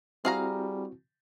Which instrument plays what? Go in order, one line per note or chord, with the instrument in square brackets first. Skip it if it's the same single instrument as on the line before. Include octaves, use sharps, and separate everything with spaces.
[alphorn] G3 [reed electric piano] C4 E4 F#4 [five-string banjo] G#4 F5 A#5